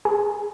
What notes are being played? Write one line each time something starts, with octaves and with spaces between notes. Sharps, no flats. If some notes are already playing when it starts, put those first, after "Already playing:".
G#4